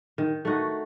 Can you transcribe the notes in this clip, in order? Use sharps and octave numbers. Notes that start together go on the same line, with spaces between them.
D#3
A3 D#4 F#4